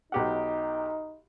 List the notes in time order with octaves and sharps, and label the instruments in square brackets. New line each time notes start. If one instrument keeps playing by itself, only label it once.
[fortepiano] B1 G4 F#5 [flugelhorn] D#4